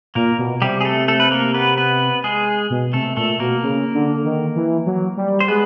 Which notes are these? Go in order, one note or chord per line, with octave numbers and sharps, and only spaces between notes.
A#2 A#3 A#4
B2
C3 G3 G4
G#4
A3 A4
A3 A4
B4
A#3 A#4
B3 B4
B3 B4
G#3 G#4
B2
C3 A3 A4
A#2 A3 A4
B2 A#3 A#4
C#3
D3
D#3
E3
F#3
G3
C5
G#3 B3 B4